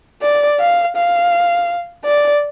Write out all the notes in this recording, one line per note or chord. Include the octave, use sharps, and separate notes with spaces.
D5
F5
F5
D5